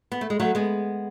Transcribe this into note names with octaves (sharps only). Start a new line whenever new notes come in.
B3
A3
G#3
F#3 A3
G#3 B3